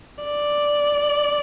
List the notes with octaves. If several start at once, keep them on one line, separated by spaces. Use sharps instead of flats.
D5